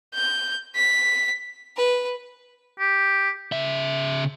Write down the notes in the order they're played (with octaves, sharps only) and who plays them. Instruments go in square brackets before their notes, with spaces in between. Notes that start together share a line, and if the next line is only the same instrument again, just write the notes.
[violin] G6
B6
[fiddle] B4
[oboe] G4
[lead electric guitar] C#3 E5